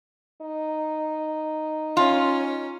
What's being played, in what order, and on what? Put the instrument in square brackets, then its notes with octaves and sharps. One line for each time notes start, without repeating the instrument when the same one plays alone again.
[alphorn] D#4
[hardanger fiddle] C#4 [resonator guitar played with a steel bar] F4